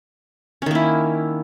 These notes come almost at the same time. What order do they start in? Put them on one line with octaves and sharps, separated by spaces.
C#4 D#3 A#3 E4